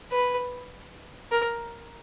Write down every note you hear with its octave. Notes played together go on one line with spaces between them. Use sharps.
B4
A#4